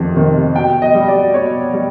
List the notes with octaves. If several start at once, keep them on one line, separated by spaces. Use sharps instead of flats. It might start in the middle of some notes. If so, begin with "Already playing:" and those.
Already playing: F2 C3 D#3
C3 D#3
B2 G5
D#5
G3
D5
B2 C#5
G3